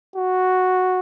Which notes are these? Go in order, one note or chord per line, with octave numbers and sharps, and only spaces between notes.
F#4